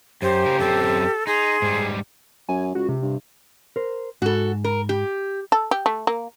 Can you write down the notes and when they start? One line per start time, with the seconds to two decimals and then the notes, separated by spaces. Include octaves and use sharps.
0.22 F#2 G4 C5
0.46 C#3 A#4
0.60 F#2 C4 A4
1.27 D#4 G#4 C6
1.62 G#2 G3
2.49 F#2 G#5
2.75 C#2 F#4
2.89 C3
3.02 G2
3.76 A#4 C5
4.22 G#2 F#4 A4
4.64 A#4
4.89 G4
5.52 A4
5.71 G4
5.86 A3
6.07 A#3